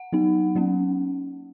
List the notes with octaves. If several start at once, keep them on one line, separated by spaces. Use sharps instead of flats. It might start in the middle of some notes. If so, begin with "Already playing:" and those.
Already playing: F#5
F#3 B3 D#4
F#3 A#3 C#4